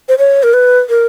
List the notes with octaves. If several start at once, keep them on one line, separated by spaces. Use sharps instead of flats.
C5
C#5
A#4
B4
A#4